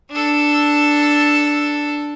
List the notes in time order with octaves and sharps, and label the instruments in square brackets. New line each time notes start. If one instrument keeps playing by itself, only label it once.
[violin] D4 A4